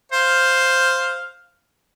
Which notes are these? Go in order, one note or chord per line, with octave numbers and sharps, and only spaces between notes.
C5 F5